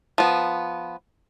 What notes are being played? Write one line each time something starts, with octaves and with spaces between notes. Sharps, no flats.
F3 B3